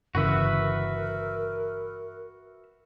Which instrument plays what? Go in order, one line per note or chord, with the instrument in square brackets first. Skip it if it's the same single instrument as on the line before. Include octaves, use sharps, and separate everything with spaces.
[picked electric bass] G1 C#3 E3 [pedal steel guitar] F#4 B4 E5 [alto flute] A#4